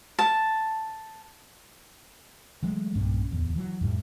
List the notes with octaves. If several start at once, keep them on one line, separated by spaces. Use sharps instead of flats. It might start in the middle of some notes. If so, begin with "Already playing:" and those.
A5
E3 F#3 G#3 A3
B1 G2 A#2 C#4
D1 E2
E3 F#3
F2 A2 G3